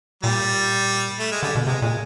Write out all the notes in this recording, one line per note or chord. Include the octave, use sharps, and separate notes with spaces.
A#2 G3
A3
G#3
D3 G3
B2
C3 G#3
A#2 G#3